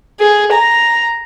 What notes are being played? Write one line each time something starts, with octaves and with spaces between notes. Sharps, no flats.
G#4
A#5